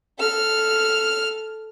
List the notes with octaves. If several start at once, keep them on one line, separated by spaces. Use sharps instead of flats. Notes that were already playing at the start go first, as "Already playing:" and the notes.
A4 F6